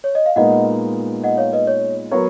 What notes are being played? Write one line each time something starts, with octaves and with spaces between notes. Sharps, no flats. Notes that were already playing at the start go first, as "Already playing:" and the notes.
C#5
D#5
F5
A#2 G#3 B3 D#4 A#4 D#5 F#5
D#5 F#5
C#5 F5
B4 D#5
C#5
F#3 B3 F#4 A#4 C#5